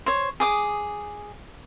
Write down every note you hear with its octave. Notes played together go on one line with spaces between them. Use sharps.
C5 C#5
G#4 D6 D#6